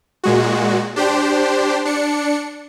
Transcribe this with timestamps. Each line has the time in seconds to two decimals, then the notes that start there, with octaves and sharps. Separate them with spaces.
0.24 A#2 G#3 F#4
0.96 D4 G4 C5
1.85 D4 C#7